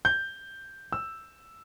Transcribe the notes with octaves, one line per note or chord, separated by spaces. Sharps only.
G6
E6